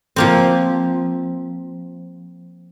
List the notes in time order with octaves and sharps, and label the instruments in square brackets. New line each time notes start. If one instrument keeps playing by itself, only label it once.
[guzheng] F3 A#3 C4